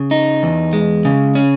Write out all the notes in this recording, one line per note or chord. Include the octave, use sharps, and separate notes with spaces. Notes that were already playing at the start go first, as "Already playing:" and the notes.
Already playing: C#3
D#4
E2
G#3
C#3
C#4